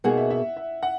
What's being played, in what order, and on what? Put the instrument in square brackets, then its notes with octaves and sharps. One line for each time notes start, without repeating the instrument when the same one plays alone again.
[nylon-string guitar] B2 A#3 D#4 G#4 [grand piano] F#5
[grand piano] E5
E5
E5
F#5